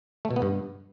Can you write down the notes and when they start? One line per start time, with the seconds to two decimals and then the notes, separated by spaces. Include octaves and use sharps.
0.25 A3
0.31 B2
0.36 B3
0.42 G2